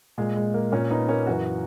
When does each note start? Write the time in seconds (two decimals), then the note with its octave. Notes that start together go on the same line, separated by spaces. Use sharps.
0.18 A#2 G#3
0.36 G#3
0.54 A#3
0.72 A#2 A#3 C#4
0.90 B3 D#4
1.08 A#3 C#4
1.26 F#2 E3 F#4 A#4